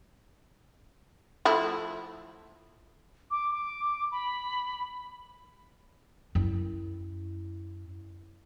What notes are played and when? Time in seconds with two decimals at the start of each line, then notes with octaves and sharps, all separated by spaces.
1.45 F3 A3 E4
3.31 D6
3.53 D6
4.12 B5
6.35 F#2 E4